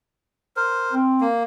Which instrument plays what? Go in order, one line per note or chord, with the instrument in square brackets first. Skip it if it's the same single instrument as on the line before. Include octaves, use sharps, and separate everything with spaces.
[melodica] A#4 C5
[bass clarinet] C4
[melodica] A#3